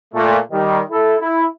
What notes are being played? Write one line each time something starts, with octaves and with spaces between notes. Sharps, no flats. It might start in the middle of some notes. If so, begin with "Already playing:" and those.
A#2 A3
D#3 G3
E4 A4
E4